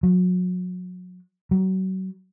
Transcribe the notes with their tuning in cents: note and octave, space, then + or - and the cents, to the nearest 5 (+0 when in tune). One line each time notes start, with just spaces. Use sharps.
F#3 -30
F#3 +30